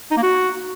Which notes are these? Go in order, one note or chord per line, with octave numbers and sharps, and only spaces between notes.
D#4
A#3
F#4